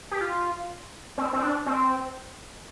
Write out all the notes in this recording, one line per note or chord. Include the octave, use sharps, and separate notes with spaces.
G4
F4
C4
C4
D4
C4